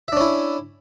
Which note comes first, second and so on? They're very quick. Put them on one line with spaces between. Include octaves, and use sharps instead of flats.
E5 D4 C#4 E4